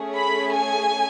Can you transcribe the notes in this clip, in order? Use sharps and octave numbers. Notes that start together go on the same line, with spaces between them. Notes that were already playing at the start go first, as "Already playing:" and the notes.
Already playing: A3 C#4 G#4
B5
G#5